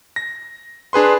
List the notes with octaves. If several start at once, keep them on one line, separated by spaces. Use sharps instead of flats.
A#6
D4 G#4 B4 C6